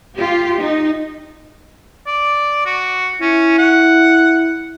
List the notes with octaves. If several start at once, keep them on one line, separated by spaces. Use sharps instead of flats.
F4 G4
D#4
D5
F#4
C#4 E4
F#5